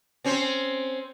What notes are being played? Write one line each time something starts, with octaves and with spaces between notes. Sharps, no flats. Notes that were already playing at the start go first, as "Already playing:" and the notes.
C4 C#4 C5